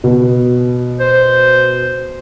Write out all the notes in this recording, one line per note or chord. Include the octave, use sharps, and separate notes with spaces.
B2
C5